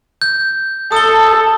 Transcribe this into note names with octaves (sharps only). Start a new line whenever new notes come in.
G6
A4 D#6 G7